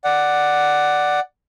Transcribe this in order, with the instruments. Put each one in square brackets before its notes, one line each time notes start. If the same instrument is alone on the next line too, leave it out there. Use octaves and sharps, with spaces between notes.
[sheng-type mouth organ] D5 F#5